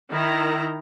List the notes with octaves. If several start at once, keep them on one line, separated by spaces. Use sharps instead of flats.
D#3 E4 A#5